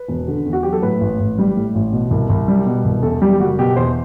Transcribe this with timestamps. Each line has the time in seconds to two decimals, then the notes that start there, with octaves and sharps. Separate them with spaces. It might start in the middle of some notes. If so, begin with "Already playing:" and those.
Already playing: B4
0.08 E1
0.28 D3
0.46 E2
0.53 F#4
0.63 F#3 G4
0.73 A4
0.82 A2 B4
1.01 A1
1.20 A1
1.38 G3
1.56 A2
1.75 A1
1.92 B2
2.11 C2
2.29 C2
2.48 G3
2.66 B2
2.84 C2
3.02 E2 A4
3.22 G3 G4
3.39 F#1 F#4
3.59 B2 G4
3.76 E2 C5